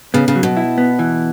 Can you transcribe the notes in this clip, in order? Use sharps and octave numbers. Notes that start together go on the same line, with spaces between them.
C#3 B3
C#3
F#3
B2
E4
B3
E3